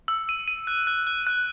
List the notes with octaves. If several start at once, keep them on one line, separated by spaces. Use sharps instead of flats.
E6
D#7
D#7
F#6
F#6
F#6
F#6